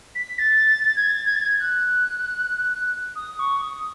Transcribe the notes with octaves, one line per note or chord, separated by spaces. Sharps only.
B6
A6
G#6
A6
G#6
A6
G#6
F#6
D#6
C#6
D#6